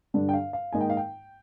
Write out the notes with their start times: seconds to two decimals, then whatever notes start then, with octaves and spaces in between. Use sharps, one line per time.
0.14 G2 D3 G3 D4
0.29 G5
0.34 F5
0.53 F5
0.72 G#2 D#3 A#3 D#4 G#5
0.81 G5
0.90 F5
0.97 G5